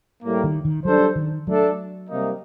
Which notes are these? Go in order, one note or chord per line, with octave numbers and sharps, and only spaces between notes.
A2 G3 A#3
D#3
D#3
F#3 G3 D4 A4 C5
D#3
F#3 A3 D4 A4
C3 G3 A#3 D#4